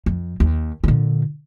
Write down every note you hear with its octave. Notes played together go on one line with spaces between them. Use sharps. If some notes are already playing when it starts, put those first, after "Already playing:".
F2
D#2
A#2 D3